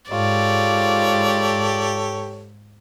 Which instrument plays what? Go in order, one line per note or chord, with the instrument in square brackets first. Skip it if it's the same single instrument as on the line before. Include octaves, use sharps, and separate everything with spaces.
[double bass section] G#2 [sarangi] F4 [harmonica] G4 A4 C#5 [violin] D5